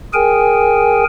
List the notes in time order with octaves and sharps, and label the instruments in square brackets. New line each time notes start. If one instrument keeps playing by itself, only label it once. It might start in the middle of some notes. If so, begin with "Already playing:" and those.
[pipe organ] G#4 A#4 G5 G#5